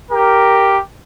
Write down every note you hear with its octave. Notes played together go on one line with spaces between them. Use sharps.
G4 A#4